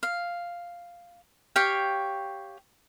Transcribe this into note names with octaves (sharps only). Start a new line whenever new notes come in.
F5
G4 C#5 F5 G5